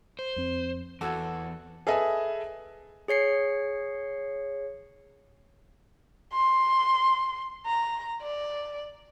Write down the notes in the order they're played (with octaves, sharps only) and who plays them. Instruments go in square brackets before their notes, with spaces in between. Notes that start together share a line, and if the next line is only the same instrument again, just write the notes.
[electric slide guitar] C5
[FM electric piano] F2 C4
[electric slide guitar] E2 [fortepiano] F#4 A4 [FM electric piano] D6 E6 G#6
[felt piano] G#4 A4 B4 D#5 E5 G#5
[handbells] G#4 C#5 C7 C#7
[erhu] C6
A#5
D5